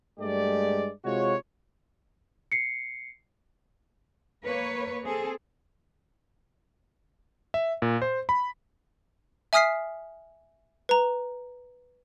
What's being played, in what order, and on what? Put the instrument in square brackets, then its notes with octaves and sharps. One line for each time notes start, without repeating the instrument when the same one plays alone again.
[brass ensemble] G2 G#3 A3 G4 D5
C3 G#3 F4 F#4 C#5
[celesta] C7 C#7
[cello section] A#3 B4 C#5
C4 G#4 A4
[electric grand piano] E5
A#2
C5
B5
[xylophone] E5 G#5 D#6 F6 B6 C7
B4 A#5